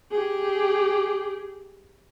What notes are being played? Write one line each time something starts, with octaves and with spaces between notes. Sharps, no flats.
G4 G#4